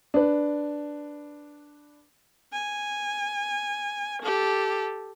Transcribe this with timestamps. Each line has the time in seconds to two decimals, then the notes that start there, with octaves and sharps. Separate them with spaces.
0.14 D4 B4
2.53 G#5
4.22 G4 A4